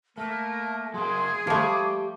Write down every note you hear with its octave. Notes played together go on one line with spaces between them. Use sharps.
A3 A#3 A#4 A5
F#3 A#3 G#4 C6
F3 A3 G4 B5 D6